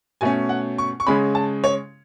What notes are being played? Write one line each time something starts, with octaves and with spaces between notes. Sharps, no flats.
B2 A3 C#4 G#5
F#5
C#6
C#6
C#3 G#3 C#4 B5
A5
C#5